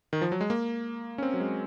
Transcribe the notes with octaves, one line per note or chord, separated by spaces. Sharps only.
D#3
F3
F#3
G#3
A#3
C#4
C4
F#3
G#3